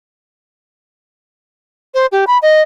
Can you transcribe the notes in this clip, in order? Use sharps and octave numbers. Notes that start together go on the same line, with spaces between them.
C5
G4
B5
D#5